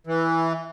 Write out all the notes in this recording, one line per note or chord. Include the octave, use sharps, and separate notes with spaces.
E3